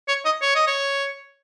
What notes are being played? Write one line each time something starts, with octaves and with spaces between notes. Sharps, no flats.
C#5
D#5
C#5
D#5
C#5